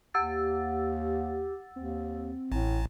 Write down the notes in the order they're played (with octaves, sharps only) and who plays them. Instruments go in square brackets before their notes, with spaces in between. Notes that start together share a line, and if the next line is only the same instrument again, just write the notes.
[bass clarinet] D#2 [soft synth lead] G4 [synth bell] F#5 E6 A6
[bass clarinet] D#2 [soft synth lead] C4
[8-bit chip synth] A1 [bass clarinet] A2